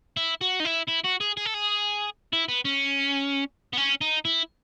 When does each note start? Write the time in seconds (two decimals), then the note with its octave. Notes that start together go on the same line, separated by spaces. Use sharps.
0.17 E4
0.41 F#4
0.60 D#4
0.65 E4
0.88 E4
1.05 F#4
1.21 G#4
1.37 G#4
1.45 A4
1.54 G#4
2.33 E4
2.49 B3
2.65 C#4
3.73 B3
3.77 C#4
4.01 D#4
4.25 E4